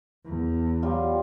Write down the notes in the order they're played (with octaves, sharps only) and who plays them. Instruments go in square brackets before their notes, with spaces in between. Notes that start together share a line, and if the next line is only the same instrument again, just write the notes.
[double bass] E2
[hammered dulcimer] F#3 G3 F4